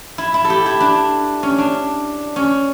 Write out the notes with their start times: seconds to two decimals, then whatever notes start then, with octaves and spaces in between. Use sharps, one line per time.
0.18 E4
0.34 E4
0.45 A4
0.50 G4
0.66 E4
0.80 D4
1.43 C#4
1.58 D4
2.36 C#4